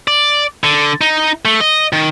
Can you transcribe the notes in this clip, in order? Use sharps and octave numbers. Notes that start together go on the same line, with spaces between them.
D5
D3
D#4
A3
D#5
D#3